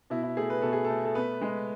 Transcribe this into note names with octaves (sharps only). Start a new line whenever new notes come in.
B2 E4
E4
A3 G#4
B4
B2 A4
G#4
A4
A3
A4
B3 B4
G#3